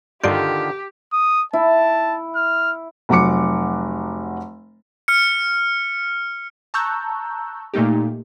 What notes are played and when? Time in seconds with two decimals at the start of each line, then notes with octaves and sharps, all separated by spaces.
0.24 G2 D3 D#3 F4 G4 D5 G6
1.13 D#6
1.53 E4 A5
2.36 F6
3.09 F1 F#3 F#5 D6 C#7
5.08 F6 C#7
6.74 A5 A#5 C#6 E6 F#6 G6
7.74 A#2 A3 A#3 D#4 G4